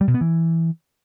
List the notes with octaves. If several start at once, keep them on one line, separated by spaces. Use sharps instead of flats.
G3
B2
B3
E3